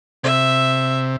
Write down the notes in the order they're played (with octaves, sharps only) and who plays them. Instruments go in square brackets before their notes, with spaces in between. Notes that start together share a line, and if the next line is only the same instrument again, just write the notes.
[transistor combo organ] C3 [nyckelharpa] E5